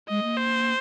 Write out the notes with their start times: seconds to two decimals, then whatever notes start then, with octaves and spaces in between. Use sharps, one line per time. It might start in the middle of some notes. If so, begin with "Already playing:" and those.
0.09 G#3 D#5
0.23 A#3
0.37 C5